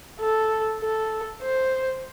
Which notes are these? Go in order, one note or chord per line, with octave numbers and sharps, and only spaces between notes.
A4
A4
C5